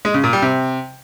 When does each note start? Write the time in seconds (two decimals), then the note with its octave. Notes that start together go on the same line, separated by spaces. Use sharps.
0.05 G#3
0.14 C#3
0.24 A#2
0.33 G3
0.42 C3